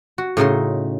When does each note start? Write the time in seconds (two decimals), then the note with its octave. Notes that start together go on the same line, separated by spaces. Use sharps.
0.18 F#4
0.37 A2 C#3 D#4 C6